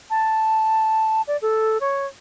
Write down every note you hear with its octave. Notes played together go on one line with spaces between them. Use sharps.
A5
D5
A4
C#5